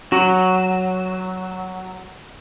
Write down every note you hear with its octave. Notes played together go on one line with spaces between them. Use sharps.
F#3 F#4